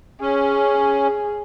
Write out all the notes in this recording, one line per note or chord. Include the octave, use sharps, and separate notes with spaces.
C#4 G#4